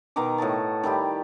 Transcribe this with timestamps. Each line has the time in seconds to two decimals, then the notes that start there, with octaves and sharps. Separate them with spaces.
0.16 B2 D#3 A#5 D6
0.38 A2 F#4 D#5 A5
0.83 D#3 G3 E4 G4